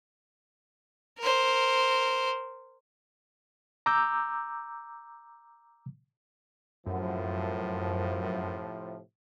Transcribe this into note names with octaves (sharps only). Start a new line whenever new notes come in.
A#4 C5
A#5 D6 E6 G6
F#2 A2 C3 F3